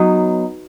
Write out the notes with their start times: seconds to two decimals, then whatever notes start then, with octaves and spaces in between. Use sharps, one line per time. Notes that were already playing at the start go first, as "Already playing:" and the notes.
Already playing: F#3 B3 D#4